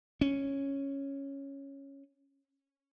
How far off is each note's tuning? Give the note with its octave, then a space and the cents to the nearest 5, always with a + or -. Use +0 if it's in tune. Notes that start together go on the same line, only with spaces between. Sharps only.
C#4 -5